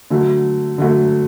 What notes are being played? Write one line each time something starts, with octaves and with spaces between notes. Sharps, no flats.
D3 F#3 A3
D3 F#3 A3